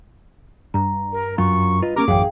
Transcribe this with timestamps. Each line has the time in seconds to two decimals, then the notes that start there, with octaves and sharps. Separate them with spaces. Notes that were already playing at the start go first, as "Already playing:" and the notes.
0.74 G2 A#5
1.12 A#4
1.38 F#2 F4 C#6
1.82 F4 B4 D#5
1.96 A#3 C#4 G4 A#4 D6
2.08 A1 F#2 G#4 F5 G5